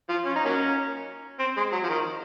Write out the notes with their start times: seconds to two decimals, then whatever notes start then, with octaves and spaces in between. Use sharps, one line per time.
0.09 F3 F4
0.25 C#4
0.36 D#4
0.45 F#3 A#3 C#4
1.40 C4
1.57 G#3
1.72 F#3
1.83 F3
1.89 D#3